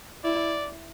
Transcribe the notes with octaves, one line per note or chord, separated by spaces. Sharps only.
E4 D5